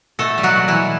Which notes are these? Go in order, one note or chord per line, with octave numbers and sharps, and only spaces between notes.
B2 A3 A4
G3
F#3 F#4
B2
E3 E4
G3